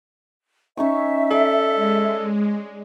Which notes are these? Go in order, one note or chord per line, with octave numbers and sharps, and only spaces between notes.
C#4 D#4 E5 C#6
A4 D5
G#3